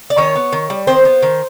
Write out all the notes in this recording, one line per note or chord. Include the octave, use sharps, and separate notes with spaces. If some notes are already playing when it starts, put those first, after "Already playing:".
D5
D#3 C#4 C#5
B3
D#3
G3
D#3 C4 C5
B3
D#3